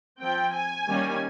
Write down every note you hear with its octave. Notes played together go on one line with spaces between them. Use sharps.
F3 C4 G5
G#5
D#3 G3 A#3 C#4